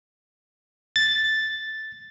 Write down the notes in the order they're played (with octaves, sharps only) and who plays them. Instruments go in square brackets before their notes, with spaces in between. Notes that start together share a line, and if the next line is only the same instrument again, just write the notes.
[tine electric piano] A6